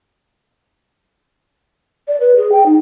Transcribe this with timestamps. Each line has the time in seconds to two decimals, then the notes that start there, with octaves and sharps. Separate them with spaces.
2.08 D5
2.20 B4
2.36 G#4
2.52 G5
2.66 D#4